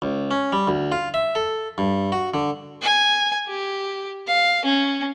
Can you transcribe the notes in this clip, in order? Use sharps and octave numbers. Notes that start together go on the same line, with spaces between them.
C#2
C#4
G3
D2
F4
E5
A4
G2
F#4
D3
G#5
G4
F5
C#4